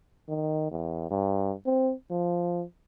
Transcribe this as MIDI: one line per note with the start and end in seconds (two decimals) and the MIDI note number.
0.29 0.71 51
0.71 1.08 40
1.11 1.53 43
1.66 1.93 60
2.11 2.63 53